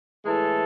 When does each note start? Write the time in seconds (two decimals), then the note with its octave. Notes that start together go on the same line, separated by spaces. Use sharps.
0.25 A2 E3 G#3 A4